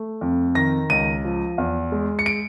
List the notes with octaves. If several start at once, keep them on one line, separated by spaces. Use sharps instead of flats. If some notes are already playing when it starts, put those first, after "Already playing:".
Already playing: A3
F2
D#3 A#6
C#2 D#7
F3
E2
G#3
C#7
D7